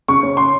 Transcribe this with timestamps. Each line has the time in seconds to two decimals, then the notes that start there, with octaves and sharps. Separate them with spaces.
0.08 C#3 C#6
0.23 C#4
0.37 C6